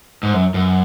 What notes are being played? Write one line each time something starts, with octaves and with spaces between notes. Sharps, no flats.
G#2
F#2
F#2